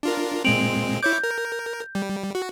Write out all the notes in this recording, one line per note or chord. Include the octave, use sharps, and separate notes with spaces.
D4 F4 A#4
A#2 G#3 C4 D7 F7 F#7
E4 C#5 D6 G6
A#4
G3
F#4